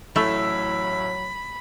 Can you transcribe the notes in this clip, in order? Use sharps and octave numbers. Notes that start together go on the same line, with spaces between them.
A1 F#3 A3 E4 B5 E6